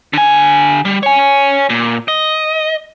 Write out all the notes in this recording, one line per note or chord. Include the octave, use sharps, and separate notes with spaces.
D3 G#5
G3
C#5 G#5
A#2
D#5